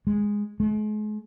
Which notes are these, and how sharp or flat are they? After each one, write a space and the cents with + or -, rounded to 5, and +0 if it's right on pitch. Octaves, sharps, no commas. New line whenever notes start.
G#3 -10
G#3 +40